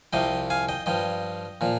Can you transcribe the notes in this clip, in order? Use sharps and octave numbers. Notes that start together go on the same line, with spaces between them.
C2 C3 F3 D#5 G5
F5 G#5
D#5 G5
G2 F3 D#5 G5
A#2 F3